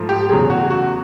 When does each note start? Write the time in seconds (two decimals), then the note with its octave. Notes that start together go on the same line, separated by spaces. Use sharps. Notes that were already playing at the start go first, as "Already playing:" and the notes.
Already playing: G#2 F3 A3
0.09 G4
0.29 E2 C#3 F#3 A3 G#4
0.50 F#4
0.70 F#4